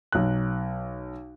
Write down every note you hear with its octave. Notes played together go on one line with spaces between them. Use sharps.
B1 F#6